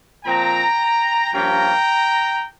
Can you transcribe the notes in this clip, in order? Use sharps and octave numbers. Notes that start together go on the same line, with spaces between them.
A#2 F3 C4 G5 A#5
G2 F3 A#3 C#4 G5 A#5